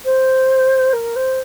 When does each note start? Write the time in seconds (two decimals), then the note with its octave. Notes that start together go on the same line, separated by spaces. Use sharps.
0.04 C5
0.92 A#4
1.15 C5